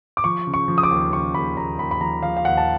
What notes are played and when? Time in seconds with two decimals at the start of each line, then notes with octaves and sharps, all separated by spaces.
0.17 D6
0.24 F3 C#6
0.47 C#3
0.54 C#6
0.68 F3
0.78 D#6
0.83 D6
0.91 D#2
1.12 C#3 C#6
1.34 D#2 B5
1.57 D#2 A#5
1.79 D#2 B5
1.91 B5
2.01 F3 A#5
2.23 F3 F5
2.37 F5
2.45 D#2 F#5
2.57 A5